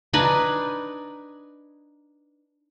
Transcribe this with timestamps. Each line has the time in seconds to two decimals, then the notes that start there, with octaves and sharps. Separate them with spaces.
0.13 D4 D#4 B4 G#5